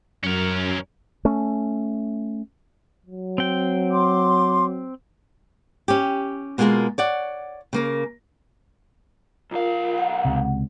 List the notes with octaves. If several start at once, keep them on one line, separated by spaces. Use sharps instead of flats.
F#2 C#4 A#4
A3 C#4
F#3
C4 G5
C6 D6
C#4 G4
B2 G#3 A#3 F4 G#4 A#4
C#5 D5 F#5
C#3 A#3 A#4
B1 F4 A#4 F5
F#5
C#2 C3